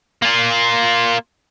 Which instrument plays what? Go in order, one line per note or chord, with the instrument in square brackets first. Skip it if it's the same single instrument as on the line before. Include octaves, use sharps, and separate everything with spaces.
[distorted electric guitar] A#3 F4